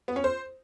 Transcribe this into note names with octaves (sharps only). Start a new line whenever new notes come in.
B3
C#4
C5